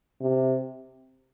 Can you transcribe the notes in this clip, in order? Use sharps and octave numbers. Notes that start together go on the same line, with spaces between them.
C3